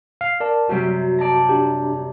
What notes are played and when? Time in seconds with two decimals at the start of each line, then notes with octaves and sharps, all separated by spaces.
0.21 F5
0.40 A#4 D5 A5
0.69 F#2 C3 G3 F#4
1.18 D5 A5 A#5
1.49 D4 G4